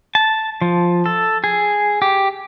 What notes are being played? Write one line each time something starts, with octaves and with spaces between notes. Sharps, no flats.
A5
F3
A4
G#4
G4